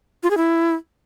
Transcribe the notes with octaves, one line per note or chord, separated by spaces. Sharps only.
F4
G#4
E4